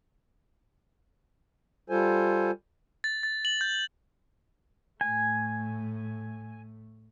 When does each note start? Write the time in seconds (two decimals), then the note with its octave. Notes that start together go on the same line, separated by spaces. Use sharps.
1.90 G3 F4 A4 C5 G#5
3.04 A6
3.23 A6
3.45 F#7
3.61 G6
5.01 A2 A3 G#5